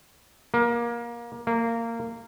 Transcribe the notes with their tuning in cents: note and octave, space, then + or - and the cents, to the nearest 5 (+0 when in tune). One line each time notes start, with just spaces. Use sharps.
A#3 +20
A#3 -20